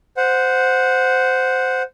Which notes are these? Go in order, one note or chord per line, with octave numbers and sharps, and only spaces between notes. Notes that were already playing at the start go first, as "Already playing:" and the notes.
C5 F#5